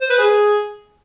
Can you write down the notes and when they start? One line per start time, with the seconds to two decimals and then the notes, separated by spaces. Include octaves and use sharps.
0.01 C5
0.10 B4
0.19 G#4